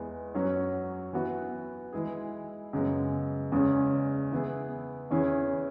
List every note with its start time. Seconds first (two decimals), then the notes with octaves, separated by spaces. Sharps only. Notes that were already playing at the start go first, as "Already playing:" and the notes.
Already playing: E2 E3 G#3 B3
0.34 F#2 F#3 C#4 F#4
1.13 E3 B3 F#4
1.93 E3 G#3 E4 G#4
2.73 F#2 C#3 G#3 B3
3.52 E2 C#3 G#3 C#4 G#4
4.31 E3 B3 E4 G#4
5.10 E2 E3 C#4 E4 G#4